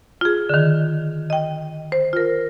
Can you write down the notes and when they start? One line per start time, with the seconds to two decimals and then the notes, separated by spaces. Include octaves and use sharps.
0.21 F4 G#4
0.49 D3 D#3
1.30 D#5 G5
1.92 C5
2.13 F4 A#4